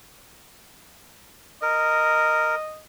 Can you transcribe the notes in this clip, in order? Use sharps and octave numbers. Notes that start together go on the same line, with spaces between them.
A#4 D#5